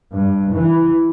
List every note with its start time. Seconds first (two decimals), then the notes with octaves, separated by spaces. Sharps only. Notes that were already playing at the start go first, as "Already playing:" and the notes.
0.14 G2
0.53 E3